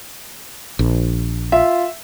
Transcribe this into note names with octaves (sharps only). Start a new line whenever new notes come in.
A#1
F4 E5